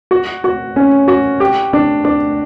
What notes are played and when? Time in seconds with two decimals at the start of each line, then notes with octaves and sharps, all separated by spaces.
0.11 F#4
0.44 F#4
0.76 C#4
1.08 F#4
1.40 G4
1.73 D4
2.05 D4